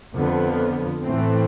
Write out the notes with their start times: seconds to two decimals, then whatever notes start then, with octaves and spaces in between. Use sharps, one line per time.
0.15 F2 D3 F3 B3
1.03 A2 E3 A3 C4